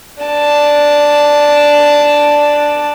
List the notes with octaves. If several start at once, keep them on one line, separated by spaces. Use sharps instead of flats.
D4 A5